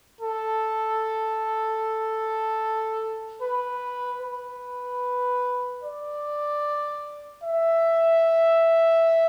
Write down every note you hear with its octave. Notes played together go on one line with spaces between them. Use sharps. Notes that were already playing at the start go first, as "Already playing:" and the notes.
A4
B4
B4
D5
E5